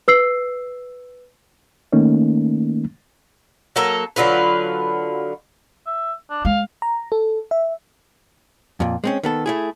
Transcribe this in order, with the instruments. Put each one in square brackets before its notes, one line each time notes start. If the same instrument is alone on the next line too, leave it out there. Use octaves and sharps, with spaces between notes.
[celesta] B4 E6 C7
[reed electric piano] D#3 A3 A#3 C#4 D#4
[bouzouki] F#3 A#3 A4 A#5
D3 F#3 F4 B4
[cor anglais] E5
D4
[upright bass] G#3 [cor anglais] F5
[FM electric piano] A#5
A4
E5
[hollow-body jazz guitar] F2 A#2
G#3 C4 C#4
D#3 B3 A4
A3 E4 G#4